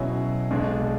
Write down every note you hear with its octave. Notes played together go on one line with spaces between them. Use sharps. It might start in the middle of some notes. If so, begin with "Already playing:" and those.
Already playing: B2 F#3 C#4 E4 G#4
B1 B2 G#3 D4